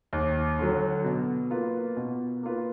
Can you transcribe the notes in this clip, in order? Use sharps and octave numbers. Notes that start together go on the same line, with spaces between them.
D#2
D3 F#3
B2
A#3 F4 B4
B2
A#3 F4 B4